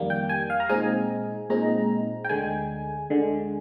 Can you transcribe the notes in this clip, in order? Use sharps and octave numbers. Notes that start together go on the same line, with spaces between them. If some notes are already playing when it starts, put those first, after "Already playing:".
Already playing: F2 D#3 G3 A#3
G5
G#5
F5
A#5
A#2 G#3 C4 D#4 G#5
A#2 G#3 C4 D#4 A#5
G5
D2 D3 G#3 G#5
D2 D3 G#3